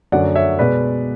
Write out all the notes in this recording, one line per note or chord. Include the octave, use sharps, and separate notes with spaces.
F#2 D3 F#3 A3 D5 F#5
C#5 E5
B2 G#3 B4 D5